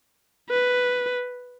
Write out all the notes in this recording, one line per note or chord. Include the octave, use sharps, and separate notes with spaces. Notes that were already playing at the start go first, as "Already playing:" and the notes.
B4